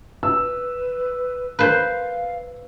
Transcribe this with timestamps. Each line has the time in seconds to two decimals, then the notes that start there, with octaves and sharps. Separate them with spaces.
0.23 B4 E6
1.59 B4 C5 F5